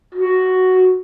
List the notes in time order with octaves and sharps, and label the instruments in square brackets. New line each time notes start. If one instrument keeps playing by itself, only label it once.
[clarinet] F#4